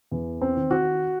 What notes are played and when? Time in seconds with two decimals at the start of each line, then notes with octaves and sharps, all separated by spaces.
0.11 E2
0.41 C4
0.57 D#3
0.71 F#4